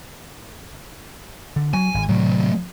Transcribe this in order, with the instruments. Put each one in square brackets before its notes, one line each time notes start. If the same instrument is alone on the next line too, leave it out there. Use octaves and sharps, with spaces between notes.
[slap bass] D3
[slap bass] F#3 [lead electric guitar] G#5
[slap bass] G#1
[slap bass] A2 C3 D#3 [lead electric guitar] F#3 A3